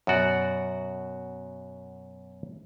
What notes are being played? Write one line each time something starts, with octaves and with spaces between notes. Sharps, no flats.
F#2 B2 F#4 D5